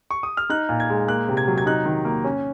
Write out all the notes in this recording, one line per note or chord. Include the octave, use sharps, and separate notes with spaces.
C#6
D#6
F6
D#4 F#6
A#2
G#6
G#3
A#3 F#6
C3
G#6
F#3
G#6
D#4 F#6
D#3
A#3
C#4